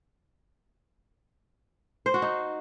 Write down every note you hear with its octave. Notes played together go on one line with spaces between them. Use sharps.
C5
F#4
D#4